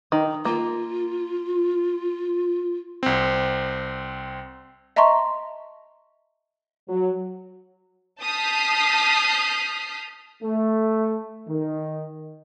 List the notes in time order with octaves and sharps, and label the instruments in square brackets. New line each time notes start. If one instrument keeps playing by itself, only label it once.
[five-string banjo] D#3
[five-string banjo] A#3 [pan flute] F4
[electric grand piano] C2 C4
[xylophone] D#5 E5 A5 A#5 C6 C#6
[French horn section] F#3
[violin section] A5 D#6 F6 G6 B6 C7
[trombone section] A3
D#3